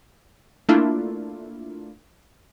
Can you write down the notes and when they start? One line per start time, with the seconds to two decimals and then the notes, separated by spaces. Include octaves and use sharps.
0.69 A3 A#3 D4 E4 F4